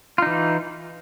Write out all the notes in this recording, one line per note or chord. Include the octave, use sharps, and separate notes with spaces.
E3 D#4 F4